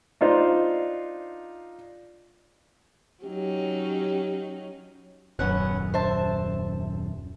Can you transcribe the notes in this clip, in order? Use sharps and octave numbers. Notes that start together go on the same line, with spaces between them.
D4 D#4 F4 C5
F#3 C#4 D#4 G4
D#1 F#2 B3 C#4 F#5
C5 E5 A5